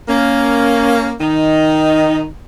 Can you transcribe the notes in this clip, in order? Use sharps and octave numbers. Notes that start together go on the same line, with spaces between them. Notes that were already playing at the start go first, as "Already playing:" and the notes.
A#3 C#4
D#3 D#4